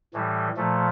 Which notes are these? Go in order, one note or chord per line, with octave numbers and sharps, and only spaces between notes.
A2 E3 G3
A#2 F3 A3